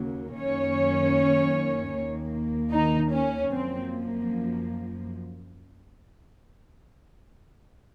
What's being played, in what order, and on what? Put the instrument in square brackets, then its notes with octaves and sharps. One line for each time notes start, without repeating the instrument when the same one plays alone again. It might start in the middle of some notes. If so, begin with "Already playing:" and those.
Already playing: [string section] D#2 C#3 F#3 A#3
F#2 D#3 A#3 C#4 C#5
D#2 D#3 A#3
D#3 D#4
C#4
F#2 F3 A#3 C4